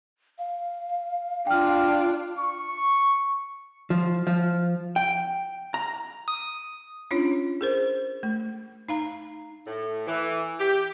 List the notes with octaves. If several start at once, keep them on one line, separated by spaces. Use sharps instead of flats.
F5
D4 F4 G5 F6
C#6
F3
F3
G5
A#5
D#6
C#4 D4 F4 C#5
G#4 A#4 C5
A3
D#4 F5 A#5
A2
E3
G4